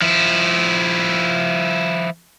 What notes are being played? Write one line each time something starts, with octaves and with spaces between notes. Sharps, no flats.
F3 E4